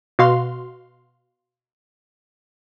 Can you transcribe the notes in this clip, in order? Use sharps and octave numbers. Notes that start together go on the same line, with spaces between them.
B2 F#4 F5 C6